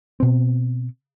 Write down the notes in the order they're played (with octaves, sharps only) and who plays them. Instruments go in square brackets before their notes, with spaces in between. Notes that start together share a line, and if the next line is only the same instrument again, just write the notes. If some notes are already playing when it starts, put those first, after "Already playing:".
[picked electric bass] B2 C4